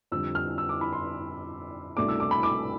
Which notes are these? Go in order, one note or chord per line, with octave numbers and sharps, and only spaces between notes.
F2 D3 G3 E6
F6
E6
D6
B5
C6
C2 B2 A3 D4 D6
E6
D6
B5
D6